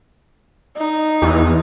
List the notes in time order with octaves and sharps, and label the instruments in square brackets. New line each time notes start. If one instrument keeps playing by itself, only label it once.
[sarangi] D#4
[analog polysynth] E2